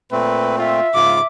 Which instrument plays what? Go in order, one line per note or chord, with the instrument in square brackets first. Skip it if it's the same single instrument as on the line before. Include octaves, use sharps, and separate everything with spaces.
[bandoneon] A#2 A3 C4 [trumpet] B4
[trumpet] F4 [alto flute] E5
[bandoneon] G#2 C#3 [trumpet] F4 [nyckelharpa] D6